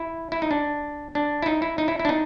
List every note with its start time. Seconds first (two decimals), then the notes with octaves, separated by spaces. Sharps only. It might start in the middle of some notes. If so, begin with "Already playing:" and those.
Already playing: E4
0.32 E4
0.42 D#4
0.51 D4
1.15 D4
1.42 E4
1.46 D#4
1.62 E4
1.78 D#4
1.88 E4
1.99 E4
2.05 D4
2.09 D#4